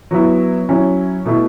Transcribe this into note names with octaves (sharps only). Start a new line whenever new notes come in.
F#3 B3 E4
F#3 C#4 E4
B2 A3 E4